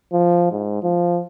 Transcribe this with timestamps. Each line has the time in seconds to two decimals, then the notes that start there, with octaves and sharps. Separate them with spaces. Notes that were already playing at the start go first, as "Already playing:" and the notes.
0.13 F3
0.51 G#2
0.83 F3